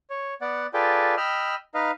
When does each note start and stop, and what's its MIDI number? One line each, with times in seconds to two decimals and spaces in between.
0.10 0.34 73
0.41 0.67 59
0.41 0.67 74
0.41 0.67 78
0.74 1.15 65
0.74 1.15 68
0.74 1.15 69
0.74 1.15 71
0.74 1.15 74
0.74 1.15 79
1.17 1.55 75
1.17 1.55 79
1.17 1.55 83
1.17 1.55 88
1.17 1.55 89
1.74 1.91 63
1.74 1.91 71
1.74 1.91 75
1.74 1.91 77